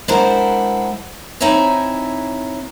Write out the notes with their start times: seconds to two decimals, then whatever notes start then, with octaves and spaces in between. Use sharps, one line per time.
0.08 G#3 D4 E4 A#4 C5 F#5
1.40 C4 D#4 E4 C#5 E5 G#5